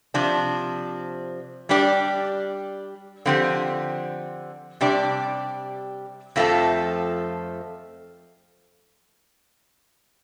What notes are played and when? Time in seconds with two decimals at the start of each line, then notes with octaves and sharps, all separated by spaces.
0.14 C3 F3 D4
1.69 G3 D4 G4 D5
3.25 D3 F3 C4 G4
4.81 C3 G3 D4 G4 D5
6.36 F2 F3 A3 F4 A4